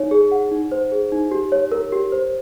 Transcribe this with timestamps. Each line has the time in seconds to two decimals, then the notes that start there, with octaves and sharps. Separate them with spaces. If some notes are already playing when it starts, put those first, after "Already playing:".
Already playing: D#4 C#5
0.11 G#4
0.32 F#5
0.51 D#4
0.72 C5
0.92 G#4
1.12 D#4
1.31 G4
1.52 C#5
1.72 A#4
1.92 G4
2.12 C5